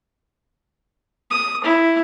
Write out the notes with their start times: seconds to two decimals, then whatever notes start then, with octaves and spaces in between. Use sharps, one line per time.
1.31 D#6
1.64 E4